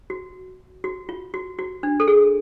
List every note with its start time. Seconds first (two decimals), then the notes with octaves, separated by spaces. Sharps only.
0.10 F#4
0.84 F#4
1.09 F4
1.34 F#4
1.59 F#4
1.83 D4
2.00 A4
2.08 G#4